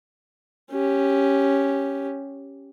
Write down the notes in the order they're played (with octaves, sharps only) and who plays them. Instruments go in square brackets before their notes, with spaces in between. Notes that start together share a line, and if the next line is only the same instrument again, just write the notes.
[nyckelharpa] C#4 G4